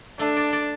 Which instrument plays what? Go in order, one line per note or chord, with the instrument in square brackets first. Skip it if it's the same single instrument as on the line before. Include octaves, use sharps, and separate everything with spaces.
[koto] A3 [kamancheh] D4
[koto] D5
D5